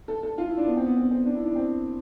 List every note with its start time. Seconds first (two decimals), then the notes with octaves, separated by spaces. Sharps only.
0.08 A4
0.23 A4
0.38 F4
0.48 E4
0.57 D4
0.67 B3
0.77 C4
0.86 B3
0.97 C4
1.11 C4
1.25 D4
1.35 E4
1.45 D4
1.56 C4